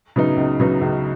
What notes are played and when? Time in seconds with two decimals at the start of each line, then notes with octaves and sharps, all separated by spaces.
0.16 C#3 F#3 B3 D#4
0.37 C#2
0.60 C#3 F#3 B3 D#4
0.81 C#2